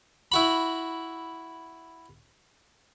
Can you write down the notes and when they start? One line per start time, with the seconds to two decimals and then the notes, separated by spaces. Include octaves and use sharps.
0.32 E4 F#4 B5